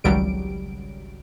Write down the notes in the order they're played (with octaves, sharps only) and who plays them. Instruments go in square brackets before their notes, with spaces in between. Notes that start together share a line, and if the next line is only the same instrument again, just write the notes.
[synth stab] G#1 C#2 F#3 G3 D7